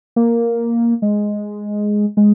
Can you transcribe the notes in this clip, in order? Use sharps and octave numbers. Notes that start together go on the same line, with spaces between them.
A#3
G#3
G#3